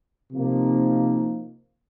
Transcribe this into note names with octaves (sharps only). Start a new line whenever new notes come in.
C3 F3 A#3 D#4